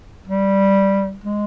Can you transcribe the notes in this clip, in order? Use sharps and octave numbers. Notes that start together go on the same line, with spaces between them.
G3
G#3